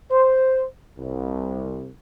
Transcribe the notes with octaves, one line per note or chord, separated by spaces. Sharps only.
C5
C2